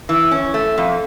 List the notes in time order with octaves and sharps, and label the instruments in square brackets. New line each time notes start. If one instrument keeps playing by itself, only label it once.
[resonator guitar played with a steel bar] E3
C#4
A3
F2